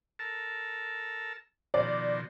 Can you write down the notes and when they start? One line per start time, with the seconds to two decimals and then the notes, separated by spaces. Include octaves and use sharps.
0.19 A4 A#4 A5
1.74 B2 D#3 F3 D5